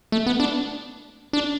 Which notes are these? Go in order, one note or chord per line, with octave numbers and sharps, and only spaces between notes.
A3
B3
D4
D4